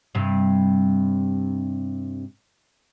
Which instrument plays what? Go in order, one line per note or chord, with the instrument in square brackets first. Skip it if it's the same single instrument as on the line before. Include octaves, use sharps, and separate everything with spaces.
[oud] G2 C3